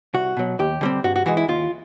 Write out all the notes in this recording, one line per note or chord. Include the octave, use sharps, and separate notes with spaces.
C2 F#4
B2 F#3
D#2 G4
D3 G3 C4
G2 F#4
F#4
E3 G#3 F#4
E4
D#2 F4